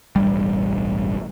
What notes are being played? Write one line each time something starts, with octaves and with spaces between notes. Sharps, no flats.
E1 A1 G2 G3